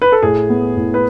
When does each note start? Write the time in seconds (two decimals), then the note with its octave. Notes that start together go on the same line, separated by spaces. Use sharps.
0.02 B4
0.12 A4
0.22 A2 G#4
0.50 B3
0.77 A2
0.94 B4